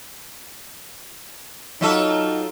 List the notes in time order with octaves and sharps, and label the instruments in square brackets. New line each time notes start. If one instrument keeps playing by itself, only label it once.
[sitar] F#3 F4 A4 [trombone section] D#4